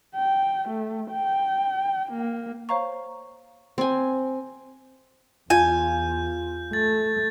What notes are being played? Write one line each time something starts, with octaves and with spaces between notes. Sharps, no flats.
G5
A3
G5
A#3
C5 C#5 F5 A#5 C#6
C4 G#5
E2 F4 G#5 G6
A3 A6